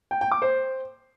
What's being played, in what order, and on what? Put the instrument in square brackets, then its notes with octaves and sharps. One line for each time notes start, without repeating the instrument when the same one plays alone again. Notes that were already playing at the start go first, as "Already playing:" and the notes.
[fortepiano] G5
G5
D6
C5